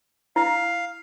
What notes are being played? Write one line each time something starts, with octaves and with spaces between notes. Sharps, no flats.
E4 F5